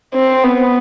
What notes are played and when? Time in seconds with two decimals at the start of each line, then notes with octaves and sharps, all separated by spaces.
0.15 C4
0.44 B3